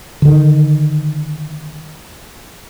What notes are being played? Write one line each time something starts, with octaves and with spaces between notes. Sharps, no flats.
D3 D#3